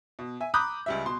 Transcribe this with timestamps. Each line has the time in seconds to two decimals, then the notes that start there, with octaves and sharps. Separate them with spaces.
0.19 B2
0.41 E5 G#5
0.54 A#5 B5 D6 D#6 F#6 G6
0.86 C#2 G3 E5
1.05 B2 C6